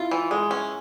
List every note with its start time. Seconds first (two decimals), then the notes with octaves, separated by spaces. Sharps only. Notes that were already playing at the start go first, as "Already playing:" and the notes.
Already playing: E4 F4
0.11 E3
0.31 G#3 G#4
0.51 C#4